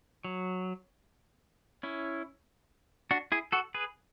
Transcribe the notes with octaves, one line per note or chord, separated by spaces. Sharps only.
F#3
C#4 E4
D4 F#4
E4 G#4
F#4 A4
G#4 B4